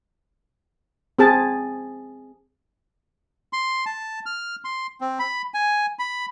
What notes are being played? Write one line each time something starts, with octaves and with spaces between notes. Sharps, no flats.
C4 G#4 A5
C6
A5
F6
C6
C4
B5
G#5
B5